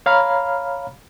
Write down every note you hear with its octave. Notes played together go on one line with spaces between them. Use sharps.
C#5 F5 A#5 B5 F6